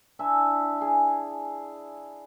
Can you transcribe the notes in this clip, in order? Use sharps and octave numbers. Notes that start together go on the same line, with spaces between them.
D4 E4 E5 G#5
G#4